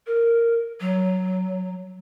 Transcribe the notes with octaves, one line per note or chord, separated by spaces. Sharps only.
A#4
F#3